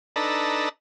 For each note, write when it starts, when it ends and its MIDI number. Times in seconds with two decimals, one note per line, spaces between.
0.16 0.69 62
0.16 0.69 63
0.16 0.69 69
0.16 0.69 71
0.16 0.69 82
0.16 0.69 88